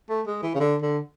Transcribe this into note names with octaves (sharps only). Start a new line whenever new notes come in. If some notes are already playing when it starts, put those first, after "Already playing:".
A3
G#3
E3
C#3
D3
D3